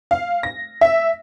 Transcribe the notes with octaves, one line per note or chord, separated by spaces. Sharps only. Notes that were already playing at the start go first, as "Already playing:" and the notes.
F5
A#6
E5